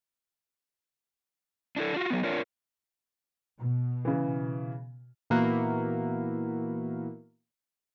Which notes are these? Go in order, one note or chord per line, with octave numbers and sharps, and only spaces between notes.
D4 E4 A4
F4 F#4
F#3 B3
D4 F4 A#4 C#5
B2
C#3 E3
A#2 E3 A#3 B3 E4 F#4